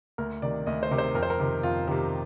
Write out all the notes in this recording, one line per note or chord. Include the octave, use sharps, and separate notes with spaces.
D2 A#4
C3 D#3 D5
D2 D#5
C5
C3 D#3
C5
F2 A#4
C5
A#4
C3 D#3
F2 F4
C3 D#3 G4